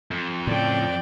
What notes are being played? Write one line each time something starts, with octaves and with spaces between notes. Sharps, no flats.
F2
A2 C#3 D5 G5